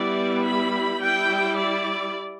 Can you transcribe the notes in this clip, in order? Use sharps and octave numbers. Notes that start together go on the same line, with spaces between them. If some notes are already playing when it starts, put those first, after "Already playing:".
Already playing: G3 B3 E4 D5
B5
G3 E4 G5
D5